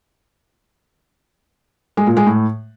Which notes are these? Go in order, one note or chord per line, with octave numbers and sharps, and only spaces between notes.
G#3
A#2
G#3
A2